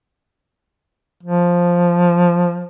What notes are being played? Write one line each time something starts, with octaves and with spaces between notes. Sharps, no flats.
F3